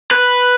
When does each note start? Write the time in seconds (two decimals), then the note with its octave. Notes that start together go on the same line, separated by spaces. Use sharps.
0.11 B4